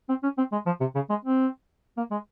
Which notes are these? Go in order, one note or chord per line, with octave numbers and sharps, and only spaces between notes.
C4
C#4
C4
G#3
F3
C3
C#3
G#3
C4
A#3
G#3